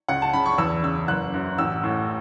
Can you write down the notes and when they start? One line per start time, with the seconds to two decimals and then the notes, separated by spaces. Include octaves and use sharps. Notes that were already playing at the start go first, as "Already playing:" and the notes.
0.09 C#2 F#5
0.22 A5
0.33 C#3 B5
0.46 C#6
0.58 E2 E6
0.83 C#3 E6
1.08 F#1 F#6
1.34 F#2
1.58 A1 E6
1.84 A2